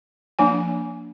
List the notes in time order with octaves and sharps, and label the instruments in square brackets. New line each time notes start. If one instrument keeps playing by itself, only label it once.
[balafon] F3 A#3 D4 G#5